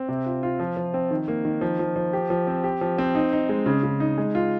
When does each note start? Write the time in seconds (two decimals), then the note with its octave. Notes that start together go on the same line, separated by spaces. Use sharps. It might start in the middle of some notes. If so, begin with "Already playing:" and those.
Already playing: C4
0.09 C3
0.26 F4
0.43 F4
0.60 F3
0.77 F3
0.94 C4
1.11 D#3
1.28 A#3
1.45 D#3
1.61 F3
1.79 F3
1.96 F3
2.13 G4
2.30 F3
2.47 C4
2.64 G4
2.81 F3
2.98 C4
3.15 D#4
3.33 D#4
3.49 G#3
3.66 C#3
3.83 C#3
4.00 D#4
4.18 G#3
4.35 F4